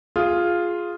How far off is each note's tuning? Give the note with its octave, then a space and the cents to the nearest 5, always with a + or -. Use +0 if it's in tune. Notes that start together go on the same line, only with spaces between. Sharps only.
F4 +0 G#4 +0